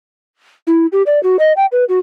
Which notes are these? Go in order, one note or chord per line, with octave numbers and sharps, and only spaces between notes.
E4
G4
D5
F#4
D#5
G5
B4
F#4